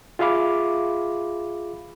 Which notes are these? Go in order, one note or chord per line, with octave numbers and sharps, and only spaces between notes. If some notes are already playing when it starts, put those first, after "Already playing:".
F4 G#4 E5 F5 B5 D6